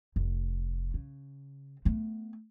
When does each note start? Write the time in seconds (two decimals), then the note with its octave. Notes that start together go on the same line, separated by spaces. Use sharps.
0.16 F1
0.94 C#3
1.85 A3 B3